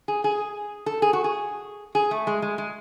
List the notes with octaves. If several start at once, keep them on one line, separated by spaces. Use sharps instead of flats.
G#4
G#4
A4
G#4
F#4
G#4
G#4
A3
G#3
G#3
G#3